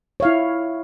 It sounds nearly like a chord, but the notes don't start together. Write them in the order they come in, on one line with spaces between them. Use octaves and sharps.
C#5 F5 E4